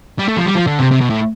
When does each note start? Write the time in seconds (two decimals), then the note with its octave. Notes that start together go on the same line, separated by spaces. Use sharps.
0.19 G3
0.28 A3
0.37 F3
0.46 G3
0.55 F3
0.67 D3
0.79 C3
0.91 C3
1.01 B2
1.10 A2